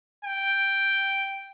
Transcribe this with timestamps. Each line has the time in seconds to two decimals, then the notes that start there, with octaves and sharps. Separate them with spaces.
0.24 G5